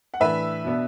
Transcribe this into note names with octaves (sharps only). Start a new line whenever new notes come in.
F#5
A2 E3 D4 B4 E5
B2 B3 D4